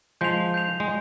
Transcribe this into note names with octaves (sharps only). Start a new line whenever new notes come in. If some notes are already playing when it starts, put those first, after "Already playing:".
F3 G#3 G6 C7 F7
G6 C7 F7
G#3